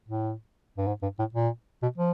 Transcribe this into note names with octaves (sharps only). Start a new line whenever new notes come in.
A2
G2
G#2
G2
A2
A#2
B2
F3